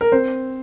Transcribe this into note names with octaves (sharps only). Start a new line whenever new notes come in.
A#4
C4 C5